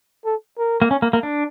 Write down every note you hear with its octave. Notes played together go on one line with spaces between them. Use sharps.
A4
A#4
A#3
C#4
A#3
A#3
D4